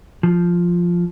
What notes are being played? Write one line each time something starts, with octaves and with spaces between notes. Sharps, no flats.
F3